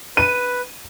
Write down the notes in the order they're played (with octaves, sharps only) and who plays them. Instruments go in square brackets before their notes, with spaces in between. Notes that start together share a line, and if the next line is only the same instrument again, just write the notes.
[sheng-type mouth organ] B4 [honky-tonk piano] D#7